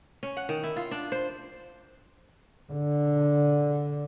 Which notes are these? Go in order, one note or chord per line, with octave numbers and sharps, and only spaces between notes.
C#4
F#5
D#3
E4
F4
D4
C5
D3